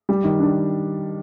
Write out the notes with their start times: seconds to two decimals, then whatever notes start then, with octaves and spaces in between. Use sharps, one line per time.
0.09 G3
0.24 D#3
0.40 D4